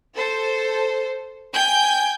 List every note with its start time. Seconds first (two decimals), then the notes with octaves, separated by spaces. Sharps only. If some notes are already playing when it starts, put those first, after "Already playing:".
0.15 A4 C5
1.53 G5 G#5 G6